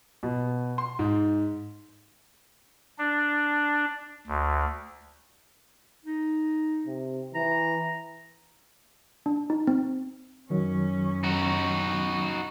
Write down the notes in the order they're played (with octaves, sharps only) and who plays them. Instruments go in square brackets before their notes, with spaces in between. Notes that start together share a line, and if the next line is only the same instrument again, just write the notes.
[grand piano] B2
C6
G#2
[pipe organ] D4
D2
[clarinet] D#4
[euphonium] C3
[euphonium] E3 [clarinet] A#5
[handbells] D4
D#4
C4
[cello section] F#2 C#4 [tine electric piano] D#3 F#3
[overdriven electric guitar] D#4 F#4